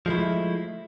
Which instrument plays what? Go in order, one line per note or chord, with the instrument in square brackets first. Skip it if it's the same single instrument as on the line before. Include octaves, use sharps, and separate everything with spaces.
[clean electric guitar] F3 G#3 A3 E4